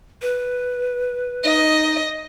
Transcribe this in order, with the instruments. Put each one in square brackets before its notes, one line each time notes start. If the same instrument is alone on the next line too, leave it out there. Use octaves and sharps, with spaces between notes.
[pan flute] B4
[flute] D#4 [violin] D#5